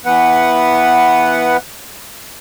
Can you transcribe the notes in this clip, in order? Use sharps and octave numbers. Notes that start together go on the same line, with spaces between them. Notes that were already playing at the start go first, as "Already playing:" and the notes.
E3 B3 B4 F#5